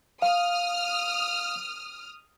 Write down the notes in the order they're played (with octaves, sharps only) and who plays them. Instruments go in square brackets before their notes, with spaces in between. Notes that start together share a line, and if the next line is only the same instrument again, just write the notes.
[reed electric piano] F5 [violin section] D#6 F6